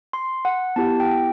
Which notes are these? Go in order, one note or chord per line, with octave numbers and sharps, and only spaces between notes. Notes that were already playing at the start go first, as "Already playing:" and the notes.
C6
F#5
B3 E4 G4 A5
G5